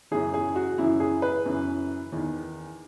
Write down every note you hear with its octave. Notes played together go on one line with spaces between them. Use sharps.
F#2 C#3 E3 G#4
G#4
F#4
F#2 C#3 E3 E4
G#4
B4
F#2 C#3 E3
E2 D#3